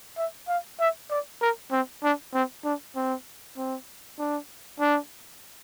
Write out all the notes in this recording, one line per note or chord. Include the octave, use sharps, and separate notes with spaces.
E5
F5
E5
D5
A#4
C4
D4
C4
D4
C4
C4
D4
D4